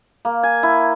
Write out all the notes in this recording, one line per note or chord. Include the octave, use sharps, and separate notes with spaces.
A#3
G#5
E4